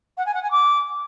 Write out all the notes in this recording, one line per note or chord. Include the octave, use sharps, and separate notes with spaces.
F#5
G#5
F#5
G#5
D6